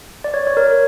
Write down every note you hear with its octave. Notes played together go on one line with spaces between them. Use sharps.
D5
C#5
C#5
A#4